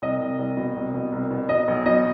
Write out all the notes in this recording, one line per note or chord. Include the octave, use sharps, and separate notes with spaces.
C2 D#5
C2
C2
B2
C2
B2
C2
B2
B2 D#5
B1
B2 D#5